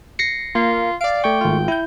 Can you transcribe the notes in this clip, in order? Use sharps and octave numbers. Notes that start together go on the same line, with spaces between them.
A#6 C7 C#7
A#3 F4
D5 F5 D7
A3 G5 C#6
G#1 F4
E4 G6